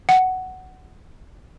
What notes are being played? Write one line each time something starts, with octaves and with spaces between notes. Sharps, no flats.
F#5